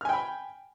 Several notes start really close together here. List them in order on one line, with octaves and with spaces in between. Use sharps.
F6 G#5 G5 B5